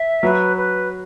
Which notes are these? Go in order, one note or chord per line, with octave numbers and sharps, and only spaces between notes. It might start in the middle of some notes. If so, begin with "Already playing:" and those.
Already playing: E5
F#3 B4
B4